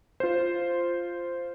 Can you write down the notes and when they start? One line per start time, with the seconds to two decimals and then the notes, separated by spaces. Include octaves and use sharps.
0.20 F4 C5